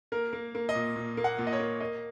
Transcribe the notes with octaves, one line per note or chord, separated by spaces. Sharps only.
A#3 A#4
A#3
A#3
D#5
A#2
A#2
A#3
F#5
A#2
D#5
C#5
A#3
A#3 D#5